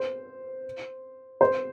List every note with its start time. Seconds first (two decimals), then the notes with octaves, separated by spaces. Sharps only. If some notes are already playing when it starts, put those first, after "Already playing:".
Already playing: C5
1.41 C5